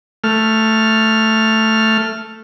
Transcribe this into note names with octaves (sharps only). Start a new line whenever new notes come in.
A3 F6